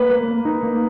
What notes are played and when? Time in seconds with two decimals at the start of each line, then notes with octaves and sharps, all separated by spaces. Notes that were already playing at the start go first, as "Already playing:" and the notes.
Already playing: A#3 B4
0.11 A#3
0.28 A#3
0.45 D#4
0.63 A#3